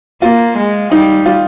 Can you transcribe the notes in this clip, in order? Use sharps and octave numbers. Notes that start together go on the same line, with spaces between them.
A#3 F4
G#3
G3 D#4
F4